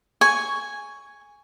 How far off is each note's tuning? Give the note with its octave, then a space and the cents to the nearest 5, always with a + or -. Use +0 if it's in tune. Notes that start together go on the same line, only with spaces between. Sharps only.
G#5 -5 C#6 +10